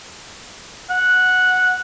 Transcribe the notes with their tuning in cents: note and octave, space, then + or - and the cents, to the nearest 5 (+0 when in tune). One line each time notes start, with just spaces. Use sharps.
F#5 -10